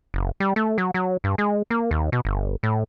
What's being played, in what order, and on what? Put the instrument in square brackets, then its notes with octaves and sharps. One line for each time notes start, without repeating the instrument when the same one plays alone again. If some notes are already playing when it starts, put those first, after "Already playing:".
[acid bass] F#1
G3
A3
F#3
F#3
G2
G#3
A#3
D#2
B2
G1
A2